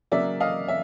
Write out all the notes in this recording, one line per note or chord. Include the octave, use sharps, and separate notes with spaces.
C#3 F#3 A#3 D5 E5
D#5 F5
E5